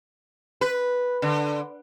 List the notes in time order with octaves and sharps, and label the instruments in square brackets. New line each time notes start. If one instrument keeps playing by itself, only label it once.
[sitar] B4
D3